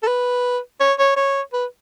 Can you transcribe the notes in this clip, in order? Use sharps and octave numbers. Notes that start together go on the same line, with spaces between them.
A4
B4
C#5
C#5
C#5
B4